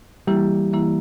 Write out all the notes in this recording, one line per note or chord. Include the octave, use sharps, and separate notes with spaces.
E3 G3 A#3 E4
E3 A#3 E4